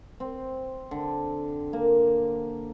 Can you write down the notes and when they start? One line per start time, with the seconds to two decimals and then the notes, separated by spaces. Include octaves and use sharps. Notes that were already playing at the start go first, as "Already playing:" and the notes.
0.20 C4
0.91 D3
1.73 A#3